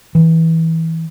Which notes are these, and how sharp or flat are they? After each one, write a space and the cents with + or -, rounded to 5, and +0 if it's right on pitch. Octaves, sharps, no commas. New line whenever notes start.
E3 -20